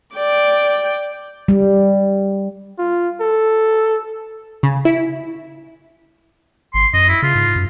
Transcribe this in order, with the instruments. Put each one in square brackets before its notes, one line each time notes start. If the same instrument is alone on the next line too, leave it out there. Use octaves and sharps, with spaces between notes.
[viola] D5 G5
[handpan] G3
[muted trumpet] F4
A4
[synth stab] C#3
E4
[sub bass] G#1 [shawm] C6
[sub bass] F#2 [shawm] D#5
[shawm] E4
[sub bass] C#3 [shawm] F4
[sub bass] G#2
F#2